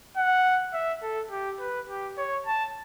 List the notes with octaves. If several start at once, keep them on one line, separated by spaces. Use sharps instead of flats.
F#5
E5
A4
G4
B4
G4
C#5
A5